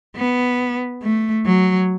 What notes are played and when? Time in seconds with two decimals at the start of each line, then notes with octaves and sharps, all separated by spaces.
0.17 B3
1.03 A3
1.46 F#3